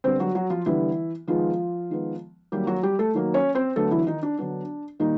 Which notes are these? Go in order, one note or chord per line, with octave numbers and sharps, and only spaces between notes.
D3 G3 B3 C4 C5
F#3 F#4
F#3 F#4
F3 F4
D3 E3 G3 B3 E4
D#3 F3 G#3 B3 F4
D#3 G#3 B3
D#3 F#3 G3 A#3 G4
F#3 F#4
G3 G4
A3 A4
D#3 F#3 A#3
C#4 C#5
C4 C5
D3 F#3 A3 B3 A4
E3 E4
D#3 D#4
D4
D3 F#3 B3 D4
A#2 D#3 G3 A#3 D#4